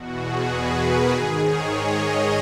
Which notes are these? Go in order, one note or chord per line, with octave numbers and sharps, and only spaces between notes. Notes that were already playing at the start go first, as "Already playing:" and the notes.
Already playing: E2 B2 F#4
G#4
B4
A#4
G#2 D#3 G#4
C#5
D#5